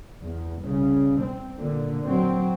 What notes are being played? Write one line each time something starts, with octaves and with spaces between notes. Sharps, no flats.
E2
C2 C#3
C4
A#2 D3
F#3 C4